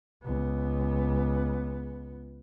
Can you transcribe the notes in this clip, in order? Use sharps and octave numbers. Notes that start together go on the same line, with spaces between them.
C#2 B3